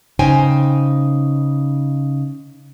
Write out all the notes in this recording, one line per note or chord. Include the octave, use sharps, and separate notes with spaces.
C#3 D#4 C5 G5 G#5